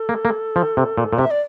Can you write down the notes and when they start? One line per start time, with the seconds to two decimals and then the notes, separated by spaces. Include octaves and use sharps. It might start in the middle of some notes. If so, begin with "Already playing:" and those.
Already playing: A4
0.09 A#3
0.25 A#3
0.56 F3
0.77 C3
0.98 A#2
1.13 A#2
1.18 C3 E5
1.31 D5